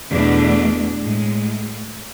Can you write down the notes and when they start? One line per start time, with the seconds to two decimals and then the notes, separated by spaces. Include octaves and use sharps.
0.12 E2 B2 A3 D4
1.02 A2 G#3